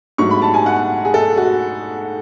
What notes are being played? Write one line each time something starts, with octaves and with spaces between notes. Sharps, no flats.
G#2 F#3 A3 C#6
B5
A5
G#5
F#5
G#4
A4
F#4